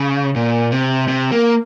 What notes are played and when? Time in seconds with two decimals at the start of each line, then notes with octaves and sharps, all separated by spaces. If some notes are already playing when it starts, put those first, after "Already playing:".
Already playing: C#3
0.36 A#2
0.72 C3
1.08 C3
1.32 A#3